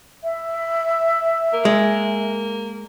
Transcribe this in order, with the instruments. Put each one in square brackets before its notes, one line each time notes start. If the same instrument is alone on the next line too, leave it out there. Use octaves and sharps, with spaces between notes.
[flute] E5
[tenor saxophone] A#3
[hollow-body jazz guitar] G#3